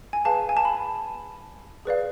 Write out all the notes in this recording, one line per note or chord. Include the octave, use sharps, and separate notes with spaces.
G#5
G#4 B4 F5 A5
G#5
A5
B5
G#4 B4 D5 F5